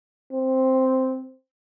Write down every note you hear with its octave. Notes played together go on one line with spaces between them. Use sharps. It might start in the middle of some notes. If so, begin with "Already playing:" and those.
C4